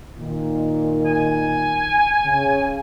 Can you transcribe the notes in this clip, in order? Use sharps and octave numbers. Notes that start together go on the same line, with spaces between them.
A#2 D#3
G#5
C#3